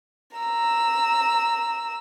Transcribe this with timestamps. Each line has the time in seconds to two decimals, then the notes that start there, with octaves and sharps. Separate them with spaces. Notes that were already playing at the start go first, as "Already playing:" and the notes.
0.37 A#5 E6